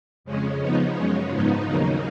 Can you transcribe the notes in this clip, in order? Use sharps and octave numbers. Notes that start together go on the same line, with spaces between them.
F2 C#3 G#3 C#4
C#3 F3 B3 D#4
F#2 C#3 G#3 C#4
G#2 F3 B3 D#4
D#2 C#3 F#3 A#3 D#4